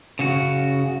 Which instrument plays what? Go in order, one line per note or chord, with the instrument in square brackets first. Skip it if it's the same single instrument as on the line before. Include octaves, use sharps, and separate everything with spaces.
[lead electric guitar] C#3 F#4